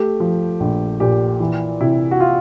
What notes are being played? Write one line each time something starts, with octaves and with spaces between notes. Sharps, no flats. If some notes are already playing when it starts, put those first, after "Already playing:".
Already playing: A3 G4
F3
A#1
A#2 G4
E3
C3 E4
F#4
F4